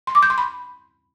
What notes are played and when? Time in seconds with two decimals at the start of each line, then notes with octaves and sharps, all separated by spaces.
0.07 C6
0.15 D6
0.23 G6
0.30 C6
0.38 B5